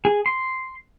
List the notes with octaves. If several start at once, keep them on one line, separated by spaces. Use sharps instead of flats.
G#4
C6